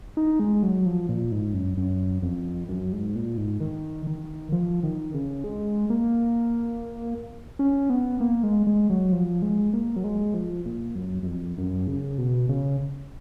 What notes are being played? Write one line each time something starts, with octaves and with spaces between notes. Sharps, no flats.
D#4
G#3
F#3
F3
A#2
G#2
F#2
F#2
F2
F#2
G#2
A#2
G#2
D#3
D#3
F3
D#3
C#3
G#3
A#3
C#4
B3
A#3
G#3
G#3
F#3
F3
G#3
A#3
F#3
G#3
F3
A#2
F#2
F#2
F2
F#2
C#3
B2
C#3